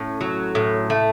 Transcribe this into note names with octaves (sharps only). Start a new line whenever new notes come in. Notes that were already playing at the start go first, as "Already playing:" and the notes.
Already playing: A2 C#4
F#3
A2
A3